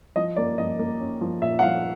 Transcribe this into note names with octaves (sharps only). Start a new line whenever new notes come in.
F3 D#5
A#3 D5
F3 D#5
A#3
C#4
F3
A#2 E5
F#5
F3 F5